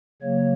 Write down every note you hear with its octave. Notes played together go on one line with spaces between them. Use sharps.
C#3 F#3 A#3 C#5